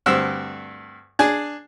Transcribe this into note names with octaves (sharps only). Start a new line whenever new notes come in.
D2 G2 C4 E6 F#6
D4 G#4 G#5